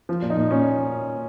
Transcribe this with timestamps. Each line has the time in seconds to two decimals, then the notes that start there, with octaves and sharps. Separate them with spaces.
0.09 F3
0.22 A#2
0.30 D#4
0.37 A#2
0.51 A#2 C#4